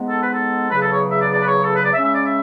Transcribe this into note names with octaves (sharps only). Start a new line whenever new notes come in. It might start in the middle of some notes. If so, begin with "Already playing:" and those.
Already playing: G#2 G#3 B3
A4
B4
A4
E2 C#3 F#3 B4
A4
C#5
E5
D5
D5
B4
C#5
A4
B4
D5
C#3 G#3 C#4 E5
E5
D5
E5